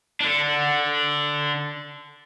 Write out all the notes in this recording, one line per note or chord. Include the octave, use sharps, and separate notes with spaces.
D3 D4